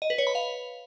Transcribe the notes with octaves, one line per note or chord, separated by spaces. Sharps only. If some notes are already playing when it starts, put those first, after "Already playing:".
D#5
B4
C#5
B5
F5